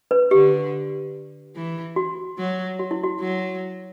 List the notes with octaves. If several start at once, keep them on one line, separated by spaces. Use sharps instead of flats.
B4
D3 G4
E3
F#4
F#3
F#4
E4
F#4
F#3